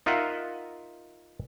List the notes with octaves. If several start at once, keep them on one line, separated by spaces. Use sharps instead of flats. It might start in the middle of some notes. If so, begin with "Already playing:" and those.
D#4 F4 A#4 D#5 E5 F#5